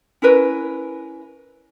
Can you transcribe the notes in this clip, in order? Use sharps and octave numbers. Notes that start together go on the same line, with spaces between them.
C#4 E4 A#4 B4